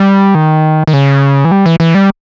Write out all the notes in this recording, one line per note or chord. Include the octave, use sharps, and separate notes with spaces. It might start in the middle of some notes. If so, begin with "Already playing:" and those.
Already playing: G3
D#3
D#3
C#3
E3
G3
E3
E3
G3